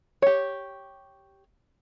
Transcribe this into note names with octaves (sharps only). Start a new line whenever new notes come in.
G4 C#5